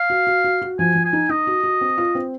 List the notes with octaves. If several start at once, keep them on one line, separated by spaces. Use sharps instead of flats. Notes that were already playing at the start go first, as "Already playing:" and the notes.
Already playing: F5
F#4
F#4
F#4
F#4
F3 G#5
F3
G#5
D#4
D#4 D#5
F#4
F#4
C4
F4
C4